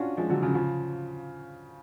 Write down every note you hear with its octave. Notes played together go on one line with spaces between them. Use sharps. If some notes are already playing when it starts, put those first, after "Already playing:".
Already playing: C#4 D4 F4 F#4
F3 G#3
D3 F#3
C#3 F3
C#3 F3